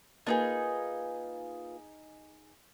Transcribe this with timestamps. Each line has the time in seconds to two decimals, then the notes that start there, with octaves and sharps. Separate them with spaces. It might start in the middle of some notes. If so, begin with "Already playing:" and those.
0.27 A#3 D4 D#4 F4 G#4 B4